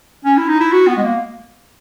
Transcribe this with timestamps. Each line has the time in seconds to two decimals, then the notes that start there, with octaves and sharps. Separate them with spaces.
0.25 C#4
0.37 E4
0.49 D#4
0.61 E4
0.72 F#4
0.88 B3
0.97 G#3
1.03 A#3